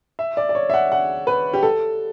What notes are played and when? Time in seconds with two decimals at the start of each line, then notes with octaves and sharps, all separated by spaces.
0.19 E5
0.37 D5
0.49 D5
0.55 C#5
0.70 E5
0.74 F#5
0.92 F#5
1.27 B4
1.53 G4
1.63 A4